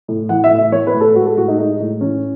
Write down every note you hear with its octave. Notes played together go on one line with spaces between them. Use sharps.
A2
E3 F#5
E5
A2
E5
E3 C#5
B4
A2
A4
G#3 F#4
A4
A2 F#4
D#4
G#3 D#4
A2
E3 C#4